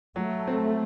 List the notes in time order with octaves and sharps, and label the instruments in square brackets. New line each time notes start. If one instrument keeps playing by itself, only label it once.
[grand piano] F#3 [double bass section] A3
[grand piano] C4